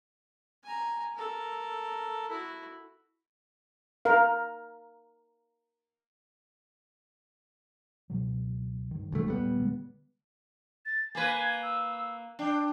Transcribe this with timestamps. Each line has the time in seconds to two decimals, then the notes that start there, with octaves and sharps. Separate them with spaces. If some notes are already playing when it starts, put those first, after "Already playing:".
0.63 G#5 A#5
1.15 A4 A#4
2.30 E4 F#4
4.05 A#4 F5
8.10 C#2 B2 F#3
8.91 G2 D#3
9.12 D2 C3 E3 G3 A3
9.28 D#1 A#2 G3 A3 B3
9.57 D3 E3 G#3
10.86 A6
11.15 A#3 B4 G#5
11.63 E6
12.39 D4 G5